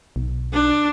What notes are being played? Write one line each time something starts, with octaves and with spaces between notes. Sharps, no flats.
B1
D4